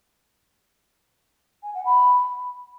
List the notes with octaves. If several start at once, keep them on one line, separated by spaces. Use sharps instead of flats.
G#5
F#5
B5